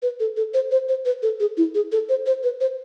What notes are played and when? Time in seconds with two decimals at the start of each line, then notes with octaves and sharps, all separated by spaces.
0.02 B4
0.20 A4
0.37 A4
0.54 C5
0.71 C5
0.89 C5
1.05 B4
1.23 A4
1.40 G#4
1.57 E4
1.75 G#4
1.92 A4
2.09 C5
2.26 C5
2.43 B4
2.61 C5